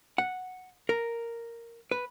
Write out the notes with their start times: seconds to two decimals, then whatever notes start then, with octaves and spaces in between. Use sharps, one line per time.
0.18 F#5
0.89 A#4
1.91 B4